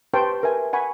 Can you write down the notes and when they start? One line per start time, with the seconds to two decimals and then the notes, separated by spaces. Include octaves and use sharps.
0.14 G4 B4 C5 G5 A5 C#6
0.43 A#4 B4 E5 G#5
0.73 F#5 G#5 B5 C#6